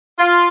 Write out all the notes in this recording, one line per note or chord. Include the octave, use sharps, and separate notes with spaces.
F4